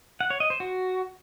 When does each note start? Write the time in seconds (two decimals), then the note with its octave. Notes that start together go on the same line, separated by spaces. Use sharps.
0.21 F#5
0.30 C#5
0.40 D#5
0.50 C5
0.60 F#4